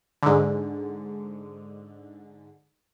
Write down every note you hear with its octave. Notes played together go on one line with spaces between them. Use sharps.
G#2 D3